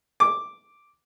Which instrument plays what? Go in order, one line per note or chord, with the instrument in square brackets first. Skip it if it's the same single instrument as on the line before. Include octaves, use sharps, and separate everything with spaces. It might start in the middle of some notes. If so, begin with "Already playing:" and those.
[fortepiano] D6